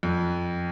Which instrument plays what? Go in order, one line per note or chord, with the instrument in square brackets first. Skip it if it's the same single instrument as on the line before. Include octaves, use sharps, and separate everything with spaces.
[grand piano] F2